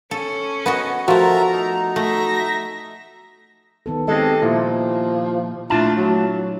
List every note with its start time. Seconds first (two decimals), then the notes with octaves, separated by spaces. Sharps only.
0.11 C#4 A4
0.66 B3 F#4 D#5
1.08 F3 A3 F#4 A#4 E5 A5 A#5
1.53 D#4
1.96 A3 E5 A#6
3.86 D#3 B3 A4
4.08 G#3 C4 G4 A4 D#5
4.42 A#2 F3 E4
5.70 A#2 A3 D4 E4 F4 A5
5.97 F#3